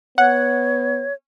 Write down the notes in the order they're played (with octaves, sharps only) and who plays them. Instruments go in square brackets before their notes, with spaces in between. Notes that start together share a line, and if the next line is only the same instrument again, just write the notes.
[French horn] B3 [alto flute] C#5 [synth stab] F#5